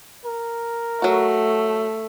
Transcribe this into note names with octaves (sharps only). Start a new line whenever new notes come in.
A#4
F#3 A3 F#4